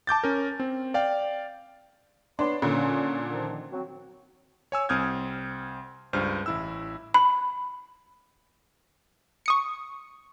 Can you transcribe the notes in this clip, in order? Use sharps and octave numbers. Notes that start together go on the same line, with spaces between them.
A5 D6 G6 A6
C#4 A#4
C4
D5 F5 G5
B3 D4 C#5 C6
A#2 D3 C#4
D#3 F3
F#3 C4 F#4
C#5 G#5 E6
C2 C4 D#6 F6 G6 G#6
C#2 G2 C5 F6
A1 E4 E6
B5
C#6 D#6 C#7